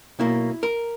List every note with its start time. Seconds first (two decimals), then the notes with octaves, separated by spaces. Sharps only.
0.19 B1 B2 A#3 E4
0.63 A#4